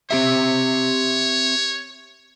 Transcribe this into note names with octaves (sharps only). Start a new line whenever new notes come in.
C4 G4 C#5 E5